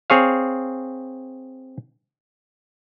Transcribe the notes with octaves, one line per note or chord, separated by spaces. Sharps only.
C4 G#4 C#5 F5